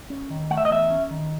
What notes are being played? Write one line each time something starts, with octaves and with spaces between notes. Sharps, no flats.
C#4
D#3
A3 F#5
E5
D#5
E2 E5
C#4
D#3